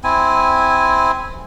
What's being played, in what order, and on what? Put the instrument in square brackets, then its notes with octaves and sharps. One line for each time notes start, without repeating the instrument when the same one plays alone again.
[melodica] C4 E4 G#5